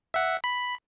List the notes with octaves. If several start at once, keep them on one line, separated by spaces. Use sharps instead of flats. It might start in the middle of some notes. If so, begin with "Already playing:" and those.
E5 F#5
B5